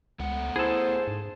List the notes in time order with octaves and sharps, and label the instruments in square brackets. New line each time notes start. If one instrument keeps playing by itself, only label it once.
[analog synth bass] C#2 [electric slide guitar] A3 B3 F#5
[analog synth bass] E4 [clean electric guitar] G#4 A4 [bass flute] C5
[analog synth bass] G#2